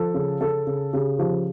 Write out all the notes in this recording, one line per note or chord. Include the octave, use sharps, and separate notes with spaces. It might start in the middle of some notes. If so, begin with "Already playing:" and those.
Already playing: F3 A4
C#3
C#3 A4
C#3
C#3 G4
F3 G4